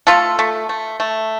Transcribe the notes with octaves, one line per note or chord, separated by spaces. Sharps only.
A3 F4 A4
A3
A3
A3